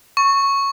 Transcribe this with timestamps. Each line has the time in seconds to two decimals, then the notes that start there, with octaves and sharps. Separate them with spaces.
0.17 C#6